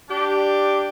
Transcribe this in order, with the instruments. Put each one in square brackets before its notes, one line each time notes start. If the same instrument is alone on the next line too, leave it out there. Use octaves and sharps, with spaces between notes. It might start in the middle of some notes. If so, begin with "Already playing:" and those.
[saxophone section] D4 G4